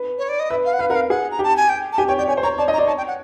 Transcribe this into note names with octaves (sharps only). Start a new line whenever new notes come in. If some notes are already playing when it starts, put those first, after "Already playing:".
Already playing: B4
C#5
D5
D#5
B4 E5
F5
F#5
B4 F5
A#4 F#5
F5
G#4 F#5
A#5
G4 A5
G#5
G5
A5
G4 G#5
C#5 G5
D5 G5
C#5 G#5
C5
C#5 A#5
D5 A5
D#5
A#5
D5
C#5 A5
G5
F#5